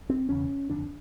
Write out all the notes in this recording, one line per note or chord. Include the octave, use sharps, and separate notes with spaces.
C4
E1 E2 C#3 C#4
F#1 F2 D3 D4